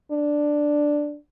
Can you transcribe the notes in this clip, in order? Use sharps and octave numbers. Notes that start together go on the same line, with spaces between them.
D4